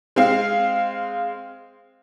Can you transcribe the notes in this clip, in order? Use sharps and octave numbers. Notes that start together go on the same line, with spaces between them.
G#3 C4 F5